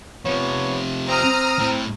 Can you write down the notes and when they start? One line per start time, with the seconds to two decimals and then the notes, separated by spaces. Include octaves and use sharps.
0.25 C3 F3 B3 C#5
1.08 C4 A#5 D#6 F6
1.60 A2 C4